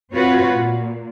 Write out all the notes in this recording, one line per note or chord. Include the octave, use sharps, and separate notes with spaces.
C4 F4 F#4 B4 C#5
A#2